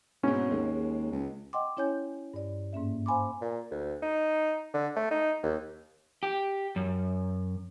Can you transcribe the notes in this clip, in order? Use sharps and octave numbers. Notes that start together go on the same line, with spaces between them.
G#2 B2 C4 C#4
D#2 G#3
C#2
D#5 F#5 G5 C6 D6
C#4 E4 C#5 G#5 G6
G2 D5
G#2 A#3 C#4 E5
C5 F5 G#5 B5 C6 D6
A#2
D2
D#4
D3
A3
D#4
D#2
G4
F#2